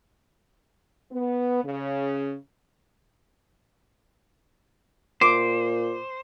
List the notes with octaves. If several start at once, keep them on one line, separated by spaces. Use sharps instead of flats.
B3
C#3
A#2 C5 D6